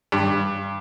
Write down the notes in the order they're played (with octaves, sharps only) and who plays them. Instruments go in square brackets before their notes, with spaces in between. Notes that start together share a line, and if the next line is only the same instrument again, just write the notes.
[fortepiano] G2